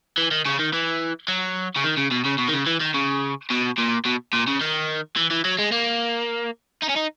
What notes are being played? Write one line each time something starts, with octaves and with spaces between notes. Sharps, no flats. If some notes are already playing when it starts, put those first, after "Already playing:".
E3
D#3
C#3
D#3
E3
F#3
C#3
D#3
C#3
B2
C#3
B2
D#3
C#3
E3
D#3
C#3
B2
A#2
B2
A#2
C#3
D#3
E3
E3
F#3
G#3
A#3
D#4
C#4
D#4